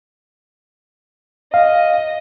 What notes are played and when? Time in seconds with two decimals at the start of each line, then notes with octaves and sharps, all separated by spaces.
1.54 D#5 F5